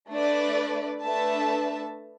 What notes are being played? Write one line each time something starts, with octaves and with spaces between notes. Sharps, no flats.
A3 D4 B4 D5
A3 D4 B4 E5 A5